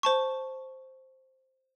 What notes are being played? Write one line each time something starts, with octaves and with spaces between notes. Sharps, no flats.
C5 A5 C#6